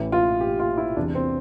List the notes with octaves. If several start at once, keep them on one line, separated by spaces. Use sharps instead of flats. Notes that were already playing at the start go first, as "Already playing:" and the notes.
Already playing: A1 A2 E3
F4
G4
F4
E4
E2 C3 E3 D4
C4